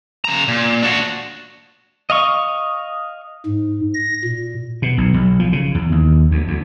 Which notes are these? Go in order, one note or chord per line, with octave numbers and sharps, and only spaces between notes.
C#3 A#5
A#2
D4 F#4
D#5 F5 C#6
G#2
A#6
A#2
B2
B1
B1
F3
C#3
E2
D#2
D2
D2